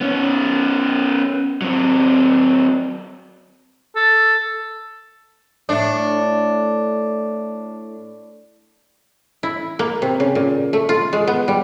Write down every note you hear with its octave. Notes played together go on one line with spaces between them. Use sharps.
B3 C#4
F#3 C4
A4
A2 A3 D4
E4
A#3
C3
C#3
A#2
A3
F4
G#3
B3
G3